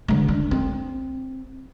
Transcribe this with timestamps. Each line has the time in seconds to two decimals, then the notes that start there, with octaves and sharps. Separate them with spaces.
0.08 D3 G#3
0.28 D4
0.51 C4